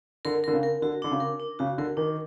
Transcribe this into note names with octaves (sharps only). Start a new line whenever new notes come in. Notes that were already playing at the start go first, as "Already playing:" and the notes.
D3 A#4
D3 A#4
C#3
A#4
D3 F#4
D3 D4
C#3
A#4
D4
C#3 F#4
D3 A#4
D#3 D4